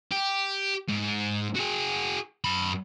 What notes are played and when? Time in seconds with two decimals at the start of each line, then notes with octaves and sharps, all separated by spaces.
0.12 G4
0.88 G#2
1.56 F#4 G#4
2.45 F#2 B5